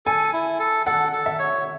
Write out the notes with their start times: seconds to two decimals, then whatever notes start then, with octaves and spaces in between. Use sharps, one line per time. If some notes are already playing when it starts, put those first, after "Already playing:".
0.06 A4 G#5
0.33 E4
0.60 A4
0.86 A4 F#5
1.12 A4
1.26 E5
1.39 C#5